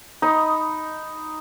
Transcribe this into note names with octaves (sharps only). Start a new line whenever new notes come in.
D#4 B5 D#6